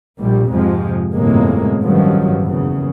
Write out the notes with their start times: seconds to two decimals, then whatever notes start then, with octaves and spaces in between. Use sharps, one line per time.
0.20 A#1 A#2 G3
0.51 F2 G#2 C3 F3 G#3
1.13 G1 F2 A2 C3 G#3 A#3
1.83 A1 G2 D#3 F3 F#3
2.42 F#1 E2 C#3